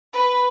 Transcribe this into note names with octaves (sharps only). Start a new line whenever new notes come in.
B4